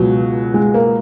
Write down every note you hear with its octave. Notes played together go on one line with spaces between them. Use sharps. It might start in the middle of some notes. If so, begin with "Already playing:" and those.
Already playing: C#2 B2 F#3
G#3
A#3